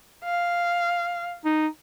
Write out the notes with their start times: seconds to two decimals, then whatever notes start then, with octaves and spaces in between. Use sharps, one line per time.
0.24 F5
1.44 D#4